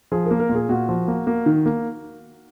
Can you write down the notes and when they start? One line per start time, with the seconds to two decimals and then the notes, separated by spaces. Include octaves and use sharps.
0.12 F3 G#4
0.25 A#4
0.31 A#3
0.40 A#4
0.49 A#2
0.55 G#4
0.69 A#2 F#4
0.89 F3
1.08 A#3
1.27 A#3
1.46 D#3
1.66 A#3